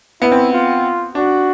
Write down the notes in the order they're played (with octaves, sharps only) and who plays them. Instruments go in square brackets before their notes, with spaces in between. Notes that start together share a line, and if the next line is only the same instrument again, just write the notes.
[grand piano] B3 [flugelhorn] E4
[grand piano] C4
[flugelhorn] F4
[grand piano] D4 [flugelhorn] F#4